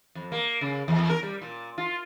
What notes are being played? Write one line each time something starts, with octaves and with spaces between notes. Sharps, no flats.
F2
A#3
C#3
E2
A#4
G3
A#2
F4